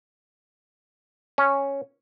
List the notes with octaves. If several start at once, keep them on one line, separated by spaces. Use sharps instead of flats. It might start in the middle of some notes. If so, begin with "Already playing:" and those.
C#4